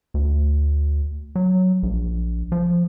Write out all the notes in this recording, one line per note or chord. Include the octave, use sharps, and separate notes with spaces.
D2
F#3
A#1
F3